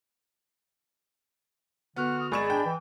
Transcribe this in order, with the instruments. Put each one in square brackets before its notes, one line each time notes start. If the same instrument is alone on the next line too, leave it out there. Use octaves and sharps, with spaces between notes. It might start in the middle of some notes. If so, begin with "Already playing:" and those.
[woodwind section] D3 F#4 F6 [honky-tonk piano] B3 [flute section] F#5 F#6
[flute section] D#6
[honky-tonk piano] G#1 C#6 E7 [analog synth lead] G#4 [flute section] D5 D#5 B5
[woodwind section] D4 [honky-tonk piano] G5
[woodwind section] E3